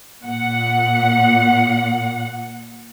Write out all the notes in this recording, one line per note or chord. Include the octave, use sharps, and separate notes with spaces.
A#2 F#5